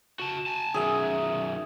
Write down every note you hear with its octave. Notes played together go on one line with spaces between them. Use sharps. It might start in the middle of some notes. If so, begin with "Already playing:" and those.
F#4 A5
G#5 A5
F#2 D#3 G#4 E5